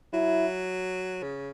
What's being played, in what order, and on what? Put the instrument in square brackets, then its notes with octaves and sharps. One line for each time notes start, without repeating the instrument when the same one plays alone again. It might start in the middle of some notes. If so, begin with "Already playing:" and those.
[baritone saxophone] F#3 [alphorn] E4
[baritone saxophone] C#3